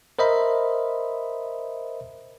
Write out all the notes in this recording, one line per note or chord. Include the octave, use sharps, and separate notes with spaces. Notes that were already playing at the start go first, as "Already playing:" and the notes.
A#4 C5 D#5 E5 B5